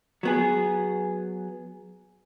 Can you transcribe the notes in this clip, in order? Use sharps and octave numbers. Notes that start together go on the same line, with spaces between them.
F#3 B3 G#4